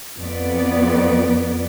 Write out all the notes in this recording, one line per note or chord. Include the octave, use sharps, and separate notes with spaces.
F2 B3 D5